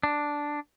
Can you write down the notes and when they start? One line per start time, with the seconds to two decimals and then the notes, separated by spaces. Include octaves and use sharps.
0.03 D4